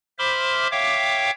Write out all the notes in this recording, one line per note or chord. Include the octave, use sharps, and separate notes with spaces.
C5 E5 B5 C6 D6 F6
C#5 E5 F5 G5 D6